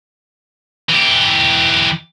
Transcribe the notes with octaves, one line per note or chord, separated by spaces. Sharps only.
E3 G4